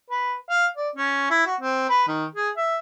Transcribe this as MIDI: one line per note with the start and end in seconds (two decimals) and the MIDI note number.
0.10 0.34 71
0.50 0.66 77
0.77 0.89 74
0.96 1.27 61
1.30 1.45 64
1.46 1.55 66
1.61 1.89 60
1.90 2.07 71
2.08 2.25 51
2.35 2.50 68
2.57 2.79 76